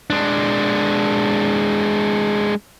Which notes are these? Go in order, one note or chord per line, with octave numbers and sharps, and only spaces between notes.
G#3 D4